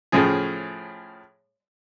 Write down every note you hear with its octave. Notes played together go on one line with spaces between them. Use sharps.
A2 C#3 F3 G#4